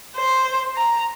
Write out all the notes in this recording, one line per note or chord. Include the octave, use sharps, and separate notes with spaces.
C5
A#5